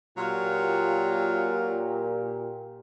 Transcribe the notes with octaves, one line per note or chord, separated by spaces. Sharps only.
A#2 F#3 F4 G4